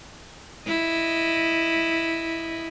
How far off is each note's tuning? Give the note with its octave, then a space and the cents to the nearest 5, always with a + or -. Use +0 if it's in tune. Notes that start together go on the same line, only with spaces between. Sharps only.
E4 +0 D#5 +0